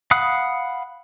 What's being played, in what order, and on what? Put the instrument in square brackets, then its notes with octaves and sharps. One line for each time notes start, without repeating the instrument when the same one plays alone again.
[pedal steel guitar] F5 F#5 B5 D#6 F#6